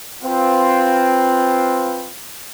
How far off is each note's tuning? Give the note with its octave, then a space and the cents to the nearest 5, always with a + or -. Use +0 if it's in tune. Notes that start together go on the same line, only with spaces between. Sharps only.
C4 +0 F4 +0 B4 +0